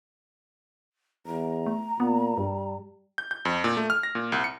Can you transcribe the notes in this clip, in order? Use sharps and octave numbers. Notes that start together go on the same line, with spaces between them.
E2 A#5
A3
A#2 B3
G2 G3
G6
G6
F2
A#2
A3
F6
A#6
A#2
C2
C#7